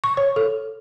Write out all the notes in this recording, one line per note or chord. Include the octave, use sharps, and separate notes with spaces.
C#6
C#5
A4